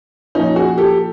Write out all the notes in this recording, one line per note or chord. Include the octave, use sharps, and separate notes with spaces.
A#2 F3 C#4 D#4
F#4 G#4
G4 A4